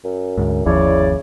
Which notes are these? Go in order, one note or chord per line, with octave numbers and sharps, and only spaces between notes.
F#2
D2 G#2
G1 D#2 C#3 F3 E4 C#5 D5